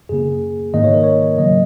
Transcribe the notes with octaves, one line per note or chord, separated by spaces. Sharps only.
F#2 C#3 A#3 G#4
G#2 D#3 A#3 D#5
C#5
A#4
C#5
C#3 F#3 A#3 D#5